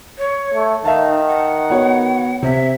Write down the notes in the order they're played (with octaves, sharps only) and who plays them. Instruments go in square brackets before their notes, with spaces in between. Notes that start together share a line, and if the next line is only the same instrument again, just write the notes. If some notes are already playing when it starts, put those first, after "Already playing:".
[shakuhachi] C#5
[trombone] A3
[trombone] D#3 [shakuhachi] D#4 [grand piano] E5 F5 A5
[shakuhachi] F#5
[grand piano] B3 F#4 C#5
[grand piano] C3 [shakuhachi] E5